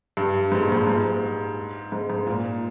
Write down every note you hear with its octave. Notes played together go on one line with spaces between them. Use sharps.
G2
G#2
A#2
G#2
G#2
G#2
G#2
A#2